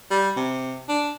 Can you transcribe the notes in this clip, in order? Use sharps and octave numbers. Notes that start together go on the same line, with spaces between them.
G3
C3
D4